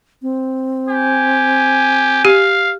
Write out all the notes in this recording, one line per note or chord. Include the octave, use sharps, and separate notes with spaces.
C4
G4 G#5
G4 F5